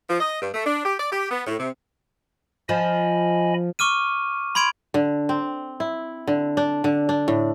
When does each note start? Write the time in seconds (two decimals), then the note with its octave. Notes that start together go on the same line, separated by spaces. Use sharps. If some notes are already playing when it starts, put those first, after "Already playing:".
0.08 F3
0.21 D#5
0.42 G2
0.54 A3
0.66 D4
0.85 G4
0.99 D5
1.12 G4
1.31 B3
1.47 A2
1.59 C3
2.69 F3 D#5 G#5 B5
3.79 C#6 D6 F6 D#7
4.55 B5 C6 G#6 D7 F7
4.94 D3
5.29 C4
5.80 E4
6.27 D3
6.57 D4
6.84 D3
7.09 D4
7.28 A2